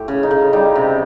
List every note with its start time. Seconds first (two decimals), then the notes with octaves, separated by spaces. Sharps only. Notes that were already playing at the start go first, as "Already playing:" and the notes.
Already playing: A2 G4
0.08 C#3
0.23 D#4
0.31 C#3
0.53 G3 D#4
0.75 C3